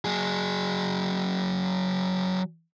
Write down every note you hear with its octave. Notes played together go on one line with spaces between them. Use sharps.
F#3 G#4